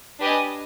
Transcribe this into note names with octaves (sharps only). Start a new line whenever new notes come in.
D4 G4 B4 D#5 G#5